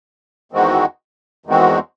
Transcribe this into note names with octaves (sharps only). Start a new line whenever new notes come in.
E2 D#3 G#3 C4 F#4
E2 D#3 G#3 C4 F#4